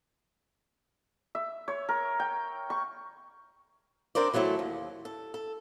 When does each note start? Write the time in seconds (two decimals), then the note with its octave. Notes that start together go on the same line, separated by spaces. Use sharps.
1.35 E5
1.68 C#5
1.89 A#4
2.20 G5
2.70 C#6
4.15 C4 D4 A#4 C5 D5
4.33 E3 F#3 A3 E4 A4 C5
4.59 D#2
5.05 A4
5.34 A4